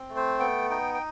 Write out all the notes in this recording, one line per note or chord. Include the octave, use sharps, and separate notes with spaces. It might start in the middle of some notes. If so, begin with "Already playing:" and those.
Already playing: C4
A3
C5
B3 G5
D#4 G5
G5